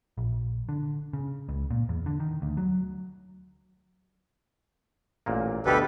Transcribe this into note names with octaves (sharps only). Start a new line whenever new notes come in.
A#1
D3
C#3
C#2
A#2
E2
D3
D#3
D2
F#3
A1 A#2 A#3
D2 B2 G4 A4 B4 F5